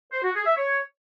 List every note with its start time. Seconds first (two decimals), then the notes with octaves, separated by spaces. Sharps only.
0.12 C5
0.23 F#4
0.34 G#4
0.45 E5
0.56 C#5